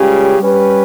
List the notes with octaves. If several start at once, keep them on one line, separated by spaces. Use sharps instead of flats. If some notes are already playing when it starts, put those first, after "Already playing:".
Already playing: C#2 C#3 G3 C#4 G4
G3 C#4 G4 B4